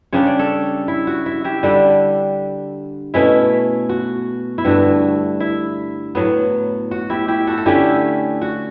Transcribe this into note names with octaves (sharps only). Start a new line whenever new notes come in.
C#3 G3 D4 C#5
D5
A4 C#5
E4
F#4
E4
E4 G4
D3 G3 D4
B2 A3 C#4 E4
F#4
E4
G2 D3 A3 F#4
E4
A2 F#3 B3
F#4
E4 G4
E4 G4
F#4 A4
A4
D3 A3 C#4 E4 G4
F#4